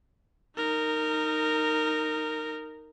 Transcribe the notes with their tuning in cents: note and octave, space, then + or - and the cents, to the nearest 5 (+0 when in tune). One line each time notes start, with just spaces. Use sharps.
D#4 +0 A#4 -15